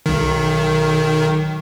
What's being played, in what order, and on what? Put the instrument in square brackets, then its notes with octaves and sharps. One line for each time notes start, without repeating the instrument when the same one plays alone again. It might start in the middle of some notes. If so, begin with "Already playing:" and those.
[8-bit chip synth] B1 D#3